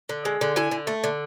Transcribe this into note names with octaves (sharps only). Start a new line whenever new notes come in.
D3
G#3
D3
E4 G#5
D3
A3
D3